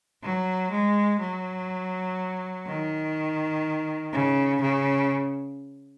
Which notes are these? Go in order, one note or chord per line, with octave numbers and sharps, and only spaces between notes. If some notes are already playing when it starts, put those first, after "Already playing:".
F#3
G#3
F#3
D#3
C#3
C#3